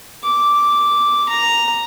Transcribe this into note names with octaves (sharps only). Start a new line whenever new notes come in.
D6
A#5